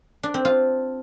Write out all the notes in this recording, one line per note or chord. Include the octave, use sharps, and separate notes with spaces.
D4
C4
F4